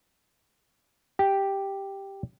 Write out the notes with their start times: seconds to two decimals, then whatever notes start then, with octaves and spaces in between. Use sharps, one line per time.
1.19 G4